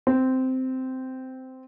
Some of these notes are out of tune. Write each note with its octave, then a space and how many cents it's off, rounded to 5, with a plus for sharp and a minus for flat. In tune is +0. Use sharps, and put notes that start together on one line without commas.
C4 -10